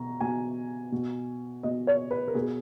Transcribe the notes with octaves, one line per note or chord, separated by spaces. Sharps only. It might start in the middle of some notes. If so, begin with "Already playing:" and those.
Already playing: B2 A#5
B2 G#5
B2
B2 D#5
C#5
B4
A#4
B2 G#4